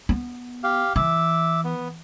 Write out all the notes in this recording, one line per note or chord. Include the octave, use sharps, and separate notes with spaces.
B3
G4 F5
E3 E5 D6
B3